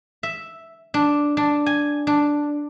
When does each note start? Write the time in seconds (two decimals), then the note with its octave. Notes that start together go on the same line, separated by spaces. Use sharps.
0.23 E5
0.94 D4
1.37 D4
1.66 G#5
2.07 D4